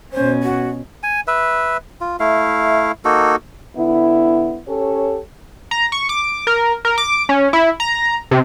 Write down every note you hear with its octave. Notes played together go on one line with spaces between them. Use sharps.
B2 C#4 C5
F#4
G#5
B4 E5
F4
A3 E4 F5
A#3 D#4 F#4 A4
D3 B3 E4
C#4 G4 A4 C#5
A#5
C#6
D6
A#4
A#4
D6
C#4
E4
A#5
C3